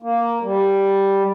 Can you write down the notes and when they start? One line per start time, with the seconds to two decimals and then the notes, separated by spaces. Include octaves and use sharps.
0.02 A#3
0.43 G3